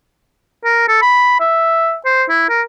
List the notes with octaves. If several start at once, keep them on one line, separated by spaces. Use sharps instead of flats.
A#4
A4
B5
E5
C5
E4
A#4